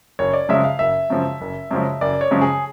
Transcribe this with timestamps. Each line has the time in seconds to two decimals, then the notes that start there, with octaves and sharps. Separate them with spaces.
0.19 F#1 C#5
0.33 D5
0.49 F#2 C#3 F3 G#3 E5
0.64 F5
0.79 F#1 E5
1.10 F#2 C#3 F3 G#3
1.41 F#1
1.71 F#2 C#3 F3 G#3
2.01 F#1 D5
2.21 C#5
2.31 F#2 C#3 F3 G#3
2.41 G#4